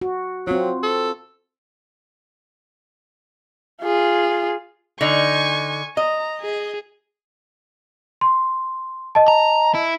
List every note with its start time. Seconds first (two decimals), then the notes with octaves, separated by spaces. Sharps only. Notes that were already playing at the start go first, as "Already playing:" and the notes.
0.02 F#4
0.47 F#3 C4 F4
0.83 A4
3.82 F4 G#4
5.01 D3 D#4 G#5 C#6
5.97 D#5 A#5
6.41 G#4
8.21 C6
9.15 D#5 A5
9.28 A#5
9.75 E4